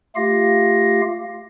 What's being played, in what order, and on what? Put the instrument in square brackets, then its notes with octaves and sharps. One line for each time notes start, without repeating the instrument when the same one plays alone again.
[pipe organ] A3 F4 G4 F5 A#6